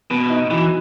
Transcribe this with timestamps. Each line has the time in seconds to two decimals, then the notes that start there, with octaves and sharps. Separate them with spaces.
0.10 B2 B3
0.30 D#4
0.51 E3 F#3